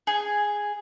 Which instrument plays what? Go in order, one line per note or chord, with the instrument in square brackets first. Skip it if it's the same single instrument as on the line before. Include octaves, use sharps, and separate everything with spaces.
[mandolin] G#4